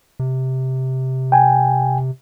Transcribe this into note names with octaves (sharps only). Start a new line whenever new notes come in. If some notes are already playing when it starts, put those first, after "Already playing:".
C3
G5 G#5